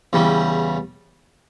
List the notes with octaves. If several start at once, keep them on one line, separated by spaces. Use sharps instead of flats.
E2 C#3 E3 G3